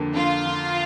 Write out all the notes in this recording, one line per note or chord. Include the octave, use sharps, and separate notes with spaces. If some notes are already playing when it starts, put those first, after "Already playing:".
Already playing: F2 D3 A#3
D3 F4
D3